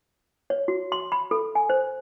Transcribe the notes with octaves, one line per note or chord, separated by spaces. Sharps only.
C#5
F#4
C6
B5
A4
G#5
C5